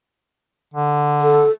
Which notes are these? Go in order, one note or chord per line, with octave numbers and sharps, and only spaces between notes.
D3
A4